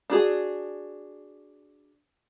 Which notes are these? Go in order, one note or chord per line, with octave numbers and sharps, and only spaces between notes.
D4 F#4 G#4